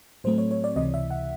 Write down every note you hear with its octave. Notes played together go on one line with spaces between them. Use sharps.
A2 F#3 A3 C4 C5
C#5
C#5
D5
C#2 C3 E3 D#5
E5
F#5